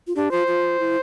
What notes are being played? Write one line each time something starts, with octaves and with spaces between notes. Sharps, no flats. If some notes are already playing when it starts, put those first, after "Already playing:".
F4
D4 G4
F4 C5
F4
E4